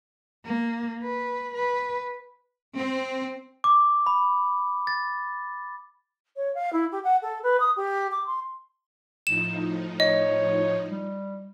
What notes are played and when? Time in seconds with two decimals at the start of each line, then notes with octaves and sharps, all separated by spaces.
0.45 A#3
1.02 B4
1.54 B4
2.76 C4
3.64 D6
4.06 B5
4.87 A6
6.36 C#5
6.54 F5
6.72 E4
6.92 G4
7.04 F#5
7.22 A4
7.43 B4
7.60 D#6
7.76 G4
8.12 D6
8.26 C6
9.27 A2 F3 D#4 E7
10.00 C#5 D#5
10.89 G3